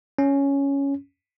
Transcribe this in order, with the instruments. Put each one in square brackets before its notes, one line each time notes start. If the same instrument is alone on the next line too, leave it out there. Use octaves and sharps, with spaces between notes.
[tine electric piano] C#4